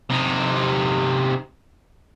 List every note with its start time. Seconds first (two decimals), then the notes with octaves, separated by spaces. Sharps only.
0.10 C3 D#4